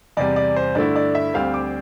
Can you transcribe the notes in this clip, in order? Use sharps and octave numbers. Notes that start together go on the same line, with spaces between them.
E2 C3 G3 D5
D5
C5
G2 D3 A3 E4 D5
D5
E5
D2 D3 G3 C4 F5
D6